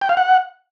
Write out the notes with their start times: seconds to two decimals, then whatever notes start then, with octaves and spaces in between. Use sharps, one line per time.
0.01 G5
0.09 F5
0.17 F#5